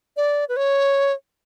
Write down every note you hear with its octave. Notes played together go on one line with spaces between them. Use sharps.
D5
B4
C#5